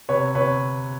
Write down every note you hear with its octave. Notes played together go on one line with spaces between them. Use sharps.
C3 B4 C#5
C3 B4 C#5